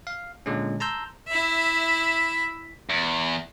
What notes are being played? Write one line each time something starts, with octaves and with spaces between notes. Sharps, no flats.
F5
A#2 D3 G#3 C#4
A5 A#5 C6 E6 G6
E4 E5
E2